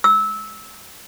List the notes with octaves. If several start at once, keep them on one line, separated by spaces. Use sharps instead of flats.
E6